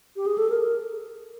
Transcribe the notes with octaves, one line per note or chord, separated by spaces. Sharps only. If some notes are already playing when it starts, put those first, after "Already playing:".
G4
G#4
A4
A#4